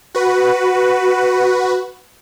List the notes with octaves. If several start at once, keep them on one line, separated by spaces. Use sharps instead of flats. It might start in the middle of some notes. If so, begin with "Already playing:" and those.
F#4 B4